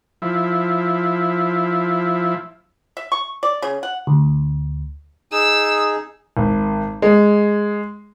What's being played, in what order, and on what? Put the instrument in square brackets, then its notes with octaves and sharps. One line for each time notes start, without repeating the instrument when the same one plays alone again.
[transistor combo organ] F3 E4
[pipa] E5
C#6
D5
C#3
F#5
[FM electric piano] D2
[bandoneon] D#4 G#4 [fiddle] E6
[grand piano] G#1
G#3